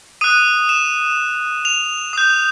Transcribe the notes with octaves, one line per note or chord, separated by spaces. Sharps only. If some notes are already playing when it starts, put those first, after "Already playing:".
D#6 F#6 D#7
E7
F7
D#6 G6